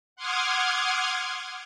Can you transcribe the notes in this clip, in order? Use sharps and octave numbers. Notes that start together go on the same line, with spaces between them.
F#5 C6 D6 D#6 F6 G#6